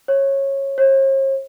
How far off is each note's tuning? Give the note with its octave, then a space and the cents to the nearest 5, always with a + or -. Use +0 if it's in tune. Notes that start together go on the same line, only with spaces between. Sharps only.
C#5 -20
C#5 -45